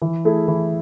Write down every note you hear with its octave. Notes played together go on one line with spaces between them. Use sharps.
E3
A3 E4 G#4
E3